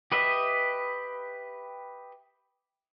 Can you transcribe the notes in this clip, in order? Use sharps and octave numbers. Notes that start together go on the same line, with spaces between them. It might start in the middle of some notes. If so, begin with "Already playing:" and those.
G4 B4 D#5 E5